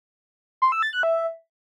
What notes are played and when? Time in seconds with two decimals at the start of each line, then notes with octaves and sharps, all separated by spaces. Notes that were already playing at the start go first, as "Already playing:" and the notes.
0.62 C6
0.72 E6
0.82 A6
0.93 F#6
1.03 E5